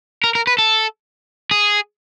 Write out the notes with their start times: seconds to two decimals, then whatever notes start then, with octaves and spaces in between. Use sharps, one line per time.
0.24 A#4
0.35 A#4
0.47 B4
0.58 A4
1.51 G#4